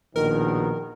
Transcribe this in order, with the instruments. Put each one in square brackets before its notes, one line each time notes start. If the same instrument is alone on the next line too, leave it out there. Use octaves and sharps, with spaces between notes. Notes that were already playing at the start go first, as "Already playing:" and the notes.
[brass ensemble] A#1 B2 D#3 [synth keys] A#4